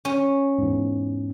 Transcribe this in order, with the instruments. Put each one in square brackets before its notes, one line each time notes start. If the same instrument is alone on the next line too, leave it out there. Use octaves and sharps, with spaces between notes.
[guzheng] C#4
[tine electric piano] E2 G#2